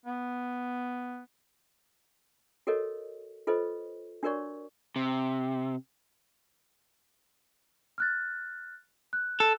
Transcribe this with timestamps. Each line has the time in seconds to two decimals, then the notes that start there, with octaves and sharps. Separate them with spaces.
0.05 B3
2.67 F#4 A4 A#4 C#5 D#5
3.47 F4 A4 B4 C5 D#5
4.23 D4 F#4 A#4 C#5 D5 C#6
4.96 C3
7.98 F6 F#6 A6
9.13 F#6
9.40 A4